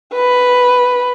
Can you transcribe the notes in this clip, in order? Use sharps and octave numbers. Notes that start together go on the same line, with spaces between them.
B4 B5